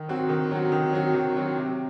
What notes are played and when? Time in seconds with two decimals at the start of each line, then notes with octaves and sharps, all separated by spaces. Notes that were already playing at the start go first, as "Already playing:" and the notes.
Already playing: D#3
0.08 F#3 C4 F#4
0.29 D#3
0.51 F#3 C4 F#4
0.72 D#3
0.93 F#3 C4 F#4
1.14 D#3
1.36 F#3 C4 F#4
1.57 C3